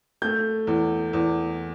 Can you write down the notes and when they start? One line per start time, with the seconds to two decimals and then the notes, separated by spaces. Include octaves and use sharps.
0.22 A3 G6
0.67 E2
1.13 E2